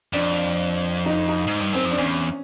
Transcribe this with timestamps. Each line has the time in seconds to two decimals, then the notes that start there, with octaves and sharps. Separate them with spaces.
0.13 F2 D4
1.06 D#4
1.28 D#4
1.47 G#2
1.60 G2
1.73 F#2 C4
1.85 F2
1.91 D4
1.98 E2 C#4